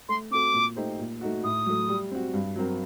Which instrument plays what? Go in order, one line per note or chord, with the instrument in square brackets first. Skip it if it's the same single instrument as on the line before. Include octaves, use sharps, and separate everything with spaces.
[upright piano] A3 [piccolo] C6
[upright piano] C4 F#4 A4 [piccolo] D6
[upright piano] A#2
A3 D#4 G4 C5
A#2
A3 D#4 F#4
[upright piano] A2 [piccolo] D#6
[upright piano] F#3 A3
G3
C4 F#4
G2
F#3 C4 F#4 A#4